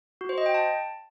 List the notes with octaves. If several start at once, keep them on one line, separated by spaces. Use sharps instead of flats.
F#4
C5
D#5
G5
A5